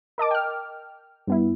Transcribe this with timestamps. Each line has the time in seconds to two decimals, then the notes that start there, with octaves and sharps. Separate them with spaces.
0.18 A#4 D#5 A5 D6
0.31 G5 F6
1.27 G2 B3 E4